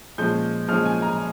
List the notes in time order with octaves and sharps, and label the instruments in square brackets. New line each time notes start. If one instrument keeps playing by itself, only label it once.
[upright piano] A#2 F3 G#3 C#4 G6
A#2 F3 G#3 C#4 F6
G#5
A#5